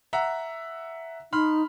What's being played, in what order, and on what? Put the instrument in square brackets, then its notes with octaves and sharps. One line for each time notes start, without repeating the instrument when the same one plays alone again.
[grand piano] E5 F#5 A#5
[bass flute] D#4 [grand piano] B5 C6 F6